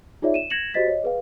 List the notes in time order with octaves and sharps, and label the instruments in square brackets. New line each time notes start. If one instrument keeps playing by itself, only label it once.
[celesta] D#4 F4 G#4 C#5 D5 E5
D#7 E7
G#6 A#6 C#7 E7 F#7
F#4 G4 C5 D#5 A6 B6
C#5 D#5
G#4 B4 F5